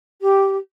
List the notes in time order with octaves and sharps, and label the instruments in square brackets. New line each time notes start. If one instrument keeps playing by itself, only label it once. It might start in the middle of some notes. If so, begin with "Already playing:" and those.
[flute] G4